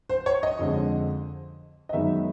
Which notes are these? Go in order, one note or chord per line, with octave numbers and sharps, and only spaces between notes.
C5
C#5
D#5
F2 D3 F3 G#3
D#5
F#2 D#3 G#3 B3 D#4 E5